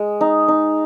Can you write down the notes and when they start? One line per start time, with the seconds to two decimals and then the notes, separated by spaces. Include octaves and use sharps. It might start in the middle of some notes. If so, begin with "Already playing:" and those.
Already playing: G#3
0.21 D#4
0.48 D#4